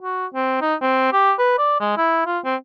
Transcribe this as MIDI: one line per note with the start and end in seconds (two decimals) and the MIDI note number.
0.01 0.26 66
0.35 0.57 60
0.62 0.75 63
0.82 1.11 60
1.13 1.32 67
1.39 1.54 71
1.58 1.78 74
1.80 1.96 56
1.97 2.22 64
2.27 2.39 65
2.45 2.55 60